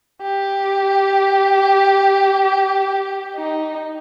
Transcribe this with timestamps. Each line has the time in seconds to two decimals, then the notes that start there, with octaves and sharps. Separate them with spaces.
0.21 G4
3.36 D#4